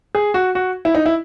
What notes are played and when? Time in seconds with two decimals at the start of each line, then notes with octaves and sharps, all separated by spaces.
0.15 G#4
0.34 F#4
0.55 F#4
0.85 E4
0.95 D#4
1.06 E4